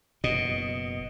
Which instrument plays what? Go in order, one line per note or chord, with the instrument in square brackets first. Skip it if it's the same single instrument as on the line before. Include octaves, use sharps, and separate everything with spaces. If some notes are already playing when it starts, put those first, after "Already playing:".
[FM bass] F#1 [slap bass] B2 [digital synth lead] D#5